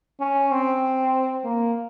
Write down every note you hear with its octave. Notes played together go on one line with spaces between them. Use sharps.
C#4
C4
A#3